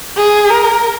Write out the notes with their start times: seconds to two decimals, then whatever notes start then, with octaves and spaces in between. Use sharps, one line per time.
0.16 G#4
0.50 A#4